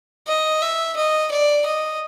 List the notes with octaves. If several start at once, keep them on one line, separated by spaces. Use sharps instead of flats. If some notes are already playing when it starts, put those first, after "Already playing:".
D#5
E5
D#5
D5
D#5